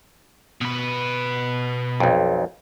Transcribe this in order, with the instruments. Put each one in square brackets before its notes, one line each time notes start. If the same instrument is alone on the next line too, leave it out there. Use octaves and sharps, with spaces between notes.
[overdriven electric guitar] B2 B4
[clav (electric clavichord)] B1 F2